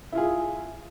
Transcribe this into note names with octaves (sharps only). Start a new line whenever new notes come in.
E4 F4 G#4